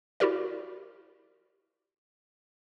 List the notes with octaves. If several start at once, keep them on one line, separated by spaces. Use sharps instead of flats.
E4 F#4 G4 A#4 D5